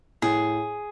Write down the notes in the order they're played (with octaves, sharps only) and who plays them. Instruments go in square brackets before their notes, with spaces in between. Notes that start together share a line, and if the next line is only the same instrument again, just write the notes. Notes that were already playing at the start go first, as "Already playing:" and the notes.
[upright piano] A2 [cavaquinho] G#4